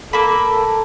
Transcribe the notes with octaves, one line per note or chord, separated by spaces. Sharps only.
A#3 A4 B5